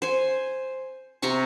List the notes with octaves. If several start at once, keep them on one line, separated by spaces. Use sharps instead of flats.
C5 G#5
C3 A#5 C6 C#6